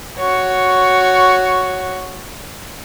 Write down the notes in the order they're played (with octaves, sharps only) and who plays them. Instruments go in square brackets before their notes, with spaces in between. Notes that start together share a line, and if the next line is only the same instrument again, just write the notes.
[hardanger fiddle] F#4 C#5